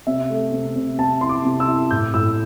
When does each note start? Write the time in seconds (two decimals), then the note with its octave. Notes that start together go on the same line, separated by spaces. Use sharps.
0.07 C3 E5
0.30 A3
0.52 C3
0.76 C3
0.99 C3 A5
1.21 E4 C6
1.29 D6
1.45 C3
1.60 E6
1.68 E4
1.91 A2 G6
2.14 A2 E6